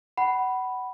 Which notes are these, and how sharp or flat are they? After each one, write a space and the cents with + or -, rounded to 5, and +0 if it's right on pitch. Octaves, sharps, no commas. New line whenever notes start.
F#5 +25 B5 +0